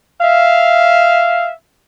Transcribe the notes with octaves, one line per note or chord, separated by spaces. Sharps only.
E5 F5